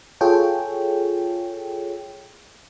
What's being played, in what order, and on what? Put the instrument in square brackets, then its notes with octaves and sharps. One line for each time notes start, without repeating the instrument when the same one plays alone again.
[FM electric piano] F4 G#4 A4 C#5 G5